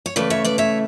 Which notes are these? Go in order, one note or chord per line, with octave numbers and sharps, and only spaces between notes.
C#5
C#3 E3 A3 B4 D5
C#5 E5
B4 D5
C#5 E5